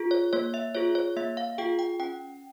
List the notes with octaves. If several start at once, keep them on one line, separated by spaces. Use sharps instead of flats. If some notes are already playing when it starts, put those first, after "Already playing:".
Already playing: F4 G#4
C#5
A#3 C#5
E5
F4 G#4 C#5
C#5
A#3 E5
F5
F4 G#4 G5
G5
C#4 G5